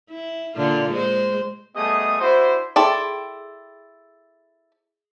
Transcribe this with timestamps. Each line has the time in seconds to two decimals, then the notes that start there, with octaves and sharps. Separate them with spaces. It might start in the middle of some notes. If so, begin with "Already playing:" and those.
0.11 E4
0.56 A#2 D3 F4
0.91 G#3 C5
1.75 G3 A3 B3 G#4 D#5 D#6
2.20 D4 E4 F#4 C5
2.76 E4 G#4 A4 D5 G5 C6